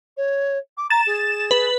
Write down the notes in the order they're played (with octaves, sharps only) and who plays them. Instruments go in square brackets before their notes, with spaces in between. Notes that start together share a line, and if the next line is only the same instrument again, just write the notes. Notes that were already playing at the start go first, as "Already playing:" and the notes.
[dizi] C#5
D6
[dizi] A#5 [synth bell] A6 E7
[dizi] G#4
[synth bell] B4